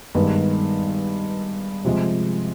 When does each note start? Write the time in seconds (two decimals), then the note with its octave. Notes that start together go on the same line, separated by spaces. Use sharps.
0.15 G2 D#3 G#3 B3
1.85 C3 F3 G#3